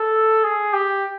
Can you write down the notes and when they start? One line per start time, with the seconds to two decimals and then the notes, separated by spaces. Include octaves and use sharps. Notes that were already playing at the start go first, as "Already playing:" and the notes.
Already playing: A4
0.44 G#4
0.73 G4